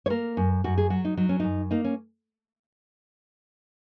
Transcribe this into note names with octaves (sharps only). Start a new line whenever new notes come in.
C#5
A#3 A#4
F#2
F#2 F#4
G#4
F#3 F#4
D#4
F#3 D#4
C#4
F#2 D#4
A#3 D#4
C#4